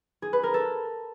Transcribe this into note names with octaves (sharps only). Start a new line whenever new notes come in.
G#4
B4
A#4
A4